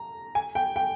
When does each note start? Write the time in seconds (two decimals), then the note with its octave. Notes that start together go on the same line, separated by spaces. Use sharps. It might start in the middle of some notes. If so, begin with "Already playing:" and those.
Already playing: A#5
0.35 G#5
0.55 G5
0.76 G5